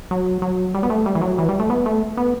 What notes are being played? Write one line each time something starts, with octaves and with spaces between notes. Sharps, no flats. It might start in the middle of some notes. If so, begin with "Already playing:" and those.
F#3
F#3
G3
B3
A3
G3
E3
F#3
E3
G3
A3
B3
A3
B3